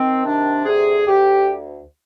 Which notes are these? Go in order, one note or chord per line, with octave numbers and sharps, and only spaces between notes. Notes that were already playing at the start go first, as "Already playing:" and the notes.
Already playing: D#3 C4
C3 D4
D2 G#4
D2 G4